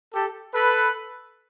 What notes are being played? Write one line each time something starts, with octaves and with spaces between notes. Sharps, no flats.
G4 A4
A4 B4